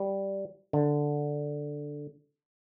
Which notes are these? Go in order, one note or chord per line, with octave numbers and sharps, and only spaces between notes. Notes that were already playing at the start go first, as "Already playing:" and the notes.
Already playing: G3
D3